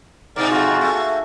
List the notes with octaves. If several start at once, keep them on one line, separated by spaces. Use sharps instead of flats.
G#2 B2 D#4 A#4 D5
F2 F4 F#4
A3
A#3 F#4